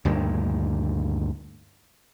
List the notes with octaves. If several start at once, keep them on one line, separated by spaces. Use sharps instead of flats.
D2 G2 A#2 D#3